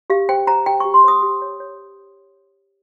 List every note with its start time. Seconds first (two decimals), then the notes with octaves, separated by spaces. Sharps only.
0.10 G4 F5
0.29 C5 G5
0.47 C5 A#5
0.66 G4 G5
0.80 G4 C#6
0.94 C6
1.04 C5 D#6
1.22 G4 D#6
1.42 C#5
1.60 C#5